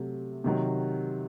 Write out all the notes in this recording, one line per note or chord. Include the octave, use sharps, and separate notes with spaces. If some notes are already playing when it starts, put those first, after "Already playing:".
Already playing: C3 F#3 A3
C3 D#3 F#3